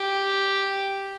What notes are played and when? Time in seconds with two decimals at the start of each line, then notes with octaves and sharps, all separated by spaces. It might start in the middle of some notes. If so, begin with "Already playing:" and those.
Already playing: G4